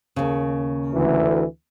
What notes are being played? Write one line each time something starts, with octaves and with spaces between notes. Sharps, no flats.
D#2 C#3
D2 E3